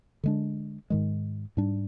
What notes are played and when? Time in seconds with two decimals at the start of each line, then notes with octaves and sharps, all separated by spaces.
0.24 D3 G#3 D4
0.90 G#2 D#3 G#3
1.57 G#2 G3 D4